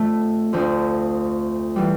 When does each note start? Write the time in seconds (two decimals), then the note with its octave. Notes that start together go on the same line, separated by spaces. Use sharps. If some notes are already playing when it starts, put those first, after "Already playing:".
Already playing: F2 D3 F3 A3
0.53 D2 D3 F3
1.76 E3 G3